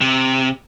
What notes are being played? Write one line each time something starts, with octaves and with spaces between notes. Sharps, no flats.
C3